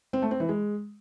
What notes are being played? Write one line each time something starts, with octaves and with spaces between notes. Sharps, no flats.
C4
A3
C4
E3
G#3